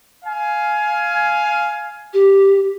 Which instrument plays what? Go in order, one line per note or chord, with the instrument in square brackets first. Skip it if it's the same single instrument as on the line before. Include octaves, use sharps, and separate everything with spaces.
[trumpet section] F5 G#5
[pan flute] G4